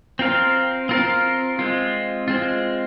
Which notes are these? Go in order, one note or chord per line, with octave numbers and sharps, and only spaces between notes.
C4 F4 A#4 F5
C4 F4 A#4 F5
G#3 C4 F4
G#3 C4 F4